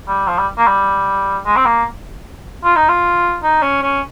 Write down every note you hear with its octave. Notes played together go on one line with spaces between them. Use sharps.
G3
F3
G3
A#3
G3
G#3
C4
A#3
F4
D#4
F4
D#4
C#4
C#4